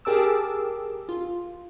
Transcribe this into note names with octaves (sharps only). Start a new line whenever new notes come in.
G4 G#4 A#4 A5 D6 E6
F4